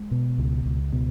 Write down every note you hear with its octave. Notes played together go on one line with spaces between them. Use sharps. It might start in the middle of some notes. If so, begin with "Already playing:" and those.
Already playing: G#3
B2
C#2
C#2
B2